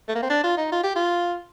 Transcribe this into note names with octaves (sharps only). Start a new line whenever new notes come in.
A3
A#3
C4
D4
F4
D#4
F4
G4
F4